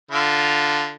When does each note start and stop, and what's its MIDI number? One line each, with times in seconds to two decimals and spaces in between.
0.11 0.93 50
0.11 0.93 65